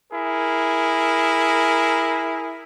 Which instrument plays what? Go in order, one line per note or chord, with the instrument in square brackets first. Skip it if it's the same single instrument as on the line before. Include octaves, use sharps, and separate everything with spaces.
[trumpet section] E4 G#4 A#4